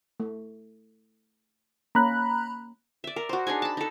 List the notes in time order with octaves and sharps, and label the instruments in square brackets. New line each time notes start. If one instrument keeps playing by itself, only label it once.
[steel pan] A3
[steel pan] A#3 C#4 [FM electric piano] A#5 B5 F#6
[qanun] D5 E5
A#4
F#4 C5
D4 D#4 G#4 G#5
A5 B5
D#4 A4